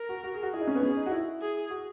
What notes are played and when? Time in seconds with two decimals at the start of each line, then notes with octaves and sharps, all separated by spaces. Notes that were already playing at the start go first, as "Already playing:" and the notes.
Already playing: A#4
0.09 F#4
0.24 F#4
0.34 G#4
0.43 F#4
0.53 E4 G#4
0.61 D#4
0.67 C#4
0.75 B3
0.82 C#4 G#4
0.97 D#4
1.06 F#4
1.11 E4
1.42 G#4
1.70 F#4